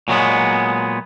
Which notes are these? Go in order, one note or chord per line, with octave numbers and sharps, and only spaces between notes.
A#2 F#3 G#3 B3